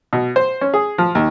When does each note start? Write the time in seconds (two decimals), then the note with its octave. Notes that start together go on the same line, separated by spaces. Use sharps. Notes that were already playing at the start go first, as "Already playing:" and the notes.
0.13 B2
0.36 C5
0.61 C#4
0.74 G#4
0.98 F3
1.15 D#2